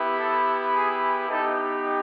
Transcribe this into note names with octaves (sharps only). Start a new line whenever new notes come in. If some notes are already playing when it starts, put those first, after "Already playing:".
Already playing: B3 E4 G4
A4
G#4
B3 D#4 G4 A4